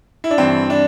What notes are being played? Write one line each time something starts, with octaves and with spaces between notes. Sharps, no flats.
E4
D4
G2 E3 C4
D4